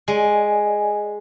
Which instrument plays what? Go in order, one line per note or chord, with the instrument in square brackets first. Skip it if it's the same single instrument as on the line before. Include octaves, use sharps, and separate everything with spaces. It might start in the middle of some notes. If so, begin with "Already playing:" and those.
[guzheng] G#3 [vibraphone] D5 D#5 G#5